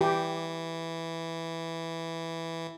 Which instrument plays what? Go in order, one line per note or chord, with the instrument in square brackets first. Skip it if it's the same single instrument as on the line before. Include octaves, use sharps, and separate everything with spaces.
[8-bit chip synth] E3 [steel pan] G4